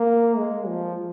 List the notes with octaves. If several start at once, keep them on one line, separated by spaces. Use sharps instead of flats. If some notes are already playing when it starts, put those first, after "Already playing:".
Already playing: A#3
G#3
F3